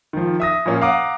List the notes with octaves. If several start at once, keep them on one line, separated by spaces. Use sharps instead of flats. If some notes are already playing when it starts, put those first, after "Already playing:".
D#3 F3
E5 D#6 A#6
A#2 F3 A#3 C#4
F5 F#5 A#5 D6 D#6